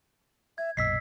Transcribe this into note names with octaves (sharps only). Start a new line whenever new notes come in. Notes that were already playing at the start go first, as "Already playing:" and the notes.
E5 G#6
B1 F#2 A#2 D#5 E6 B6 C7